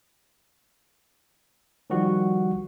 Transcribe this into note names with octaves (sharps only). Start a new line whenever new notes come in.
D#3 F3 G3 F#4 F#5